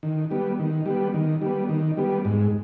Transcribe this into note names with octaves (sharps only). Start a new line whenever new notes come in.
D#3
G3 B3
D#3
G3 B3
D#3
G3 B3
D#3
G3 B3
G#2